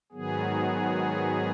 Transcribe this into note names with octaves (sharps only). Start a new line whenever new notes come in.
G#2 D#3 F#3 B3 G#4